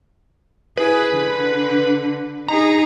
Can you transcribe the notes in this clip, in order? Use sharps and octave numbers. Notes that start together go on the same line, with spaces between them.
E4 G#4 B4
D3
D#4 G#4 A#5